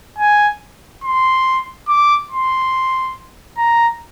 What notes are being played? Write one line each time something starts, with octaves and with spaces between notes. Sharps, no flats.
G#5
C6
D6
C6
A#5